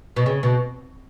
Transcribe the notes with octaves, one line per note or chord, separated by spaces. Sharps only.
B2
C#3
B2